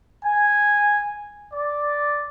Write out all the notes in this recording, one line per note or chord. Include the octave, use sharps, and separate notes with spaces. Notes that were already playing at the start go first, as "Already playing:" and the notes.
G#5
D5